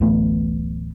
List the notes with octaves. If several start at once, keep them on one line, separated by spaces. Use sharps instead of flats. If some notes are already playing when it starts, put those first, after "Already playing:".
D1 A1 A3 B3